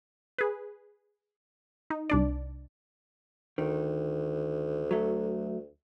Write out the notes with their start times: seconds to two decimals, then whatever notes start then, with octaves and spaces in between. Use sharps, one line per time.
0.38 G#4 B4
1.90 D#4
2.10 C2 D4 D5
3.58 D2 D#3
4.91 F#3 A3